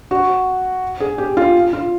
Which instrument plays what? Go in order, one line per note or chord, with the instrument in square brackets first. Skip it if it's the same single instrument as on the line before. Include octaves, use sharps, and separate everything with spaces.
[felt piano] F#4
G#4
G4
F4
F4